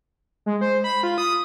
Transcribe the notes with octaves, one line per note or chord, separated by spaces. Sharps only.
G#3
C5
B5
F4
D#6